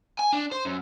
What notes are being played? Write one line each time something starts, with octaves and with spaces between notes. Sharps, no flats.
G#5
D4
C5
F#2